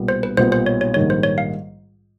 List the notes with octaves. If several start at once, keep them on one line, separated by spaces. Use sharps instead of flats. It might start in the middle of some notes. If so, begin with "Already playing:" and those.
Already playing: B1 A#2 G3 B3
C5
B4
B1 A#2 G3 B3 C5
C5
C#5
C#5
A#1 G#2 D#3 G3 C#5
C5
C#5
F5